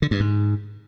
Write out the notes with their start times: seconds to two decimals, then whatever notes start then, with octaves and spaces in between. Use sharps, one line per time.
0.02 D3
0.11 G2
0.20 G#2